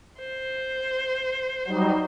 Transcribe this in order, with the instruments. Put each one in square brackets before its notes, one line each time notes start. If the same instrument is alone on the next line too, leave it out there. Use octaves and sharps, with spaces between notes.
[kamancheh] C5
[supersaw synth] F#3 G3 D#4